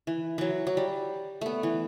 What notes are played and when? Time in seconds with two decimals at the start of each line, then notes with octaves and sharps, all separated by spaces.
0.07 E3
0.38 E3 F#3
0.67 F#3
0.77 G3
1.41 A3 B3
1.63 E3